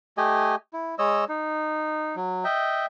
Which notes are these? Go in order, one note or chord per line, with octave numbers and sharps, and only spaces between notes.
A3 G4 D#5 G#5
E4
G#3 C#5 D#5 E6
D#4
F#3
D#5 E5 G5